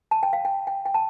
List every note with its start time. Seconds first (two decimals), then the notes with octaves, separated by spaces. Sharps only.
0.11 A5
0.23 G5
0.33 F5
0.45 G5
0.67 G5
0.86 G5
0.94 A5